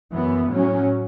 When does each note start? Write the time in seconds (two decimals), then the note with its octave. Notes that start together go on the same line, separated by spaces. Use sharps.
0.13 F#2 E3 B3
0.50 A2 F#3 C#4